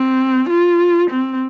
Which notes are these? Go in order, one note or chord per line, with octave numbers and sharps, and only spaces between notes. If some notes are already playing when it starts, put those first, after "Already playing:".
Already playing: C4
F4
C4